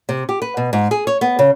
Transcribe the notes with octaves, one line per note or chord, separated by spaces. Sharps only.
C3
G4
B4
B2
G#2
G#4
C#5
B3
C#3